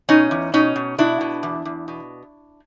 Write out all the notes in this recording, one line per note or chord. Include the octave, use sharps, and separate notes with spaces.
B2 C#4 D#4
E2
B2 C#4 D#4
B2
B2 D4 E4
B2
E2
E2
B2